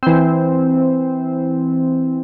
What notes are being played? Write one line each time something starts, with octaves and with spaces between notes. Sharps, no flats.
E3 C4